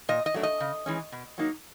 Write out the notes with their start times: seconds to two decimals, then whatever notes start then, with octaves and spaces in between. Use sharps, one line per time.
0.09 A#2 D#5
0.26 D#5
0.34 F#3 A3 D4
0.43 D#5
0.60 C#3
0.86 E3 G#3 C#4
1.12 B2
1.38 F#3 A#3 D#4